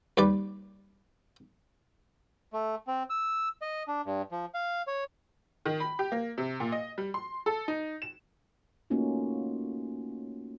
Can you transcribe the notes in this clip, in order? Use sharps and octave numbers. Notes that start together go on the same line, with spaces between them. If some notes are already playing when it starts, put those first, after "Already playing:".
D#2 G3 B4 D5
A3
C4
E6
D#5
D4
G2
F3
F5
C#5
D#3
B5
G4
A#3
C3
A#2
D#5
G3
C6
A4
D#4
E7
A3 A#3 C#4 D#4 F4 F#4